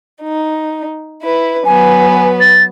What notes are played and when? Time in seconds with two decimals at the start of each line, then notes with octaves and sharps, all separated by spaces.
0.22 D#4
1.22 E4 B4
1.65 F#3 B3 B4 G#5
2.40 A6